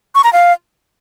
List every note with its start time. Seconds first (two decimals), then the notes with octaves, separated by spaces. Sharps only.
0.15 C#6
0.24 A#5
0.33 F5